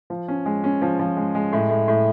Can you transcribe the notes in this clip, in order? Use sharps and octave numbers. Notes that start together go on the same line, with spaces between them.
F3
C#4
G#3
C#4
F3
F3
G#3
G#3
A2
A2
A2